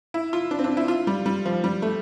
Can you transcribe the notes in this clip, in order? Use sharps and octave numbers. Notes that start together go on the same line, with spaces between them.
E4
F4
D4
C4
D4
E4
F4
G3
G3
F3
G3
A3